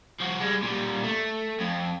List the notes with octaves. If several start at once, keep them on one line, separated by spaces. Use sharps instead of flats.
F3 F#4
G3 G#3
A#2 G3
A3
F2